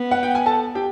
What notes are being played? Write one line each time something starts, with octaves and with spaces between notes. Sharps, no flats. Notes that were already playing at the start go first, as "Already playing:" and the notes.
Already playing: B3
F#5
G5
G#5
A4 A5
G4 G5